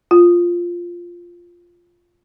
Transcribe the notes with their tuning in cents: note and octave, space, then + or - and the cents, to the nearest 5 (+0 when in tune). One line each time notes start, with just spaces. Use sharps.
F4 +0